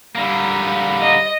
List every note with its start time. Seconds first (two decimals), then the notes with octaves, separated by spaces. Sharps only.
0.16 D3 G3 A#3 B5
1.00 D#5